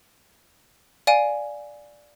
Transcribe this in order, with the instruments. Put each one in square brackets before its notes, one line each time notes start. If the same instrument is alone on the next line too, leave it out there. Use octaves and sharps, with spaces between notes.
[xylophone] D5 F5 G#5 D7 D#7